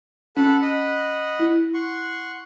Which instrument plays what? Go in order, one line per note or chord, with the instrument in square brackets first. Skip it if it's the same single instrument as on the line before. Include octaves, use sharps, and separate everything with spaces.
[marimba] C#4 [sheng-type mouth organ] A4 F#5 B5
[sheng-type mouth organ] D#5 F#5 B5
[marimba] E4
[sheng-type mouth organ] F#5 C6 C#6